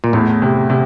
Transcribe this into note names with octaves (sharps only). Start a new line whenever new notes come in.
A#2
E2 A2
C3
C3